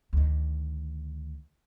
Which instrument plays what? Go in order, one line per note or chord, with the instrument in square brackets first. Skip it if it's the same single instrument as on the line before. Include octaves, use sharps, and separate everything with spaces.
[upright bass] D2 D#3